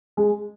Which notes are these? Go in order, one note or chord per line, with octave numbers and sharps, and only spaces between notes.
G#3